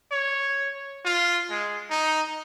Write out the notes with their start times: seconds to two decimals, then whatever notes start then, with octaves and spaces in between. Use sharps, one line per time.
0.11 C#5
1.05 F4
1.50 G#3
1.90 D#4